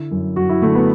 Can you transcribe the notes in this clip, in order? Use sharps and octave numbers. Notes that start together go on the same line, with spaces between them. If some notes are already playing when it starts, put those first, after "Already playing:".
Already playing: D3 E4
F#2
F#2 F#4
E4
D3 A3
B3